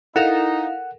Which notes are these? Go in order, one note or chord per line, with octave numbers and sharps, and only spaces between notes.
D#4 E4 A4 A#4 F5 F#5